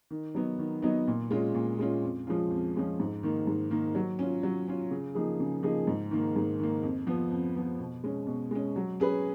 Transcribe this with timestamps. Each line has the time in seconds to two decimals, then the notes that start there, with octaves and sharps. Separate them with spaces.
0.11 D#3
0.35 F#3 B3 D#4
0.59 D#3
0.82 F#3 B3 D#4
1.08 A#2
1.31 G#3 C#4 F4
1.55 A#2
1.79 G#3 C#4 F4
2.02 F2
2.27 F3 G#3 C#4 F4
2.50 F2
2.76 F3 G#3 C#4 F4
3.00 G#2
3.23 D#3 A#3
3.47 G#2
3.71 D#3 A#3
3.95 F#3
4.19 C#4 F4
4.43 F#3
4.68 C#4 F4
4.91 C#3
5.15 F3 A#3 D#4 G#4
5.40 C#3
5.63 F3 A#3 D#4 G#4
5.87 G#2
6.11 D#3 A#3
6.36 G#2
6.59 D#3 A#3
6.83 F2
7.07 F3 B3
7.31 F2
7.55 F3 B3
7.80 B2
8.04 G#3 C#4
8.27 B2
8.51 G#3 C#4
8.76 F#3
9.00 C#4 G#4 B4